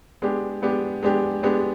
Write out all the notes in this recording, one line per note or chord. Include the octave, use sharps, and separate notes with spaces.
G#3 B3 D4 G4
G#3 B3 D4 G4
G#3 B3 D4 G4
G#3 B3 D4 G4